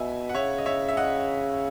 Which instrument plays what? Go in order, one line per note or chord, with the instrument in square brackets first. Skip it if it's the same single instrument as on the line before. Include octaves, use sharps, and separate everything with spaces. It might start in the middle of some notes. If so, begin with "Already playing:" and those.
Already playing: [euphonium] B2 [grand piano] E5 G#5
[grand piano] F#5
[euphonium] C#3 [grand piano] C#5 E5
[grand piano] D#5
C#5 E5
E5
D#5 F#5